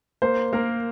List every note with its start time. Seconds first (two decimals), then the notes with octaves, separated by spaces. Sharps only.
0.22 A#3 C5
0.53 A#3 A#4